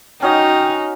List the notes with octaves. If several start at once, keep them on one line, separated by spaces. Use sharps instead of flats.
C#4 D#4 F#4 D#5 G5